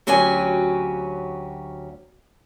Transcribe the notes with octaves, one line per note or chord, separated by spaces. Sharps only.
D2 F#3 C#4 F#4 G4 G#5